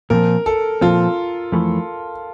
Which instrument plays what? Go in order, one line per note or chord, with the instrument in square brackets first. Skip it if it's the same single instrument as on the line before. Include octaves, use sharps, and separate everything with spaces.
[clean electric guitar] A#2 F3 C4 [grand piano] A#4
[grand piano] A4
[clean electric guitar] A#2 F3 C4 [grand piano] F4
[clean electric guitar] F2 E3 A3